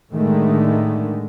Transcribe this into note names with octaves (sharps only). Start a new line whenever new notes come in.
A2 D3 D#3 G#3 A3